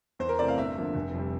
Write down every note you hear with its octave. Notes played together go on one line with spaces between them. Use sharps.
E2 C5
A#4
C3 E3 A3 C4 D5
F5
G1 E5
G2 D3 F3 A#3
F1
F2 C3 G3